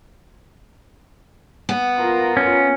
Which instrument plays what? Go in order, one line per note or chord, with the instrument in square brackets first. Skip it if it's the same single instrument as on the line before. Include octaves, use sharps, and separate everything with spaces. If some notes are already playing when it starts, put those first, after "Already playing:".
[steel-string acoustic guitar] B3
[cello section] F4 A#4
[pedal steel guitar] C#4